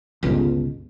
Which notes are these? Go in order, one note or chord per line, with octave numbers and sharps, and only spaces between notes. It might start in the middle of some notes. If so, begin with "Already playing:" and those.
G1 C#2 G2 B2